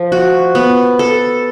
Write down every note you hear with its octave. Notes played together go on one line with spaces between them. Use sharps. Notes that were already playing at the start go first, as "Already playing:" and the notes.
Already playing: F3
F#4
B3
A4